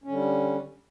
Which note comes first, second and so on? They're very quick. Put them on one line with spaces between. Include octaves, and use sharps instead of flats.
C#4 D3 G3